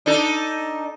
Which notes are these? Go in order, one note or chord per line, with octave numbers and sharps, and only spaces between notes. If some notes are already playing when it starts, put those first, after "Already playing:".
D4 D#4 A4